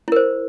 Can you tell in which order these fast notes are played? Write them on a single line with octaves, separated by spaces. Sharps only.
E4 A#4 C5